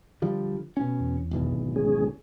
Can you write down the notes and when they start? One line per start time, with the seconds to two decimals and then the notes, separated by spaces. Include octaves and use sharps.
0.22 D3 F3 G3
0.77 B2 C#4
1.00 E2
1.31 D1 G#1 B2
1.76 G#3 C#4 G#4